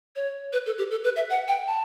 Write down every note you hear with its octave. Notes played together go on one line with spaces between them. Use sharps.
C#5
B4
A4
G4
A4
B4
E5
F#5
G5
A5